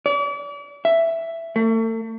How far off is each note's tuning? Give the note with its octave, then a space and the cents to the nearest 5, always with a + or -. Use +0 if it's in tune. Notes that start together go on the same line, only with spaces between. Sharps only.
D5 -40
E5 +5
A3 +40